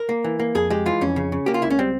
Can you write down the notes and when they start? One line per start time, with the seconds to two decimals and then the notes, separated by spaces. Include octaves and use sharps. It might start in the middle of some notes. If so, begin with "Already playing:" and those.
Already playing: A#4
0.09 A#3
0.24 E3
0.39 A#3
0.55 F2 G#4
0.70 G#3 G4
0.86 E3 F4
1.01 F2 C#4
1.16 C#3
1.32 C#3
1.46 A#3 G4
1.54 F4
1.62 C#2 E4
1.70 C#4
1.79 G3 C4